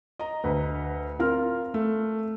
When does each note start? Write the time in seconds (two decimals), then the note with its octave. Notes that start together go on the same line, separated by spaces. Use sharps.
0.19 D#5 A#5
0.44 D2 B4
1.19 C4 F4 A#4 F6
1.74 A3